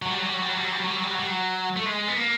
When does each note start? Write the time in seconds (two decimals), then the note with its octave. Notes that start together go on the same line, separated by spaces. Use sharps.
0.02 F#3
0.10 G3
0.18 F#3
0.26 G3
0.34 F#3
0.42 G3
0.49 F#3
0.57 G3
0.64 F#3
0.72 G3
0.80 F#3
0.87 G3
0.96 F#3
1.03 G3
1.11 F#3
1.19 G3
1.27 F#3
1.76 A3
1.86 G#3
2.08 B3
2.17 A#3